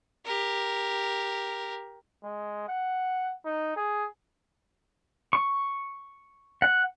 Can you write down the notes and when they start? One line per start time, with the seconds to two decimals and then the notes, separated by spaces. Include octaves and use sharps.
0.25 G4 A#4
2.23 G#3
2.68 F#5
3.45 D#4
3.77 G#4
5.33 C#6
6.62 F#5